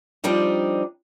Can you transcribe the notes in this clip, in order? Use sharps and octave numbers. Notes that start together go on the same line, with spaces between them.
F3 G3 C4 D4 D#4